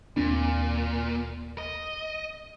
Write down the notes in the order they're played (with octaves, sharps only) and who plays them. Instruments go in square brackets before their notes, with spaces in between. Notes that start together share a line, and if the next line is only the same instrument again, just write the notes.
[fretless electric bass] D#2 C4 D4 [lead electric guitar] A#2
[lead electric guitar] D#5